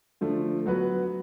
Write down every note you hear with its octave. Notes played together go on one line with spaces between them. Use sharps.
D3 F3 A3
F#3 B3 F#4 B4